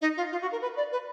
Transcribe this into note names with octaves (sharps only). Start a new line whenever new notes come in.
D#4
F4
F4
F#4
A#4
B4
D5
B4